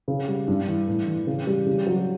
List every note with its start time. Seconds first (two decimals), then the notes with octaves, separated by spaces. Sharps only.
0.08 C#3
0.28 G3
0.48 G2
0.68 E3
0.88 A2
1.08 E3
1.27 C#3
1.47 G3
1.66 C#3
1.86 F#3